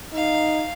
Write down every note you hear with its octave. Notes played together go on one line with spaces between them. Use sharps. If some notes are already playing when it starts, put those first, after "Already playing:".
D#4 F5